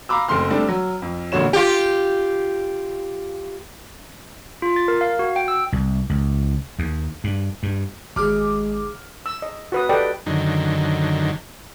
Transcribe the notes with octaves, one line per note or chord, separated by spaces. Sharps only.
F5 A#5 B5 D6 E6
F#1 A3 C4 C6 F6
G3 A3 C4 D4
F#3
F2
A1 A#2 D3 F#4 C#5 E7
F4 G4
F4
A6
A#4
F5
F#4
G5
E6
C2
C#2
D#2
G2
G2
G#1 G#3 D#4 G#4 D6 F6
E6
D#5
F#4 B4 D#6
G4 A4 B4 D5 D#5 G5
F#2 D3 D#3